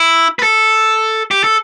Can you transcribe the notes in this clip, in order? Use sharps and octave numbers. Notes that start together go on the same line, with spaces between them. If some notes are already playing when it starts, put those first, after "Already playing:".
Already playing: E4
B4
A4
G4
A4